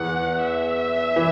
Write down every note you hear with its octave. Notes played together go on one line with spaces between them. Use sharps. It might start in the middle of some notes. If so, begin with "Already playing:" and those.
Already playing: E2 E3 F#5
E5
E3